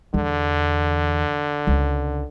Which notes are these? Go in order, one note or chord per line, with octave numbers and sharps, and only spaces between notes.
E2 D3
C#2